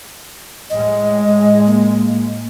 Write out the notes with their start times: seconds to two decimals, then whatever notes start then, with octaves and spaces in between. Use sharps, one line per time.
0.70 A2 G#3 D#5
1.66 A#3